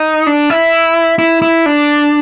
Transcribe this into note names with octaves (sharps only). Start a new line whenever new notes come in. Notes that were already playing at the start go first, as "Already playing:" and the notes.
Already playing: D#4
D4
E4
E4
E4
D4